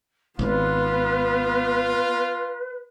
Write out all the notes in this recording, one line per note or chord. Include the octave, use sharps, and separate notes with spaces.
G#1 B3 F4 B4